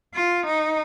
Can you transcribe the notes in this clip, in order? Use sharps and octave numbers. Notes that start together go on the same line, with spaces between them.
F4
D#4